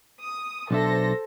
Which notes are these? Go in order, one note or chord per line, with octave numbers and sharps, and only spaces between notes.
D#6
B1 D4 A4 C5 E5 A#6